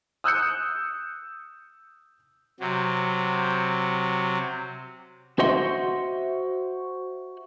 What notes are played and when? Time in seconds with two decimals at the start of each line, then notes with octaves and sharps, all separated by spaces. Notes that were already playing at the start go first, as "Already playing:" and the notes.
0.24 D#6 E6 F#6 G6 C#7
2.60 C3 F#3
5.39 F#4 C5 D#5 E5 F#5 C6